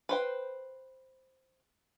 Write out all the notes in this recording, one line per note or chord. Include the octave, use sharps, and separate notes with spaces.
B4 C5 G5